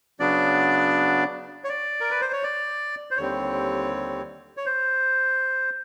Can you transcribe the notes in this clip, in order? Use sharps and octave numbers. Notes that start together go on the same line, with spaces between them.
C#3 F#3 B3 D4 D5
C#5
D5
A#4
B4
C5
C#5
D5
C5
D#2 D3 G3 C4 C#5
C#5
C5